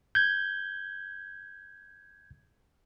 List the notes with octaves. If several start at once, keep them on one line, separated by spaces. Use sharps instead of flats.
G6 G#6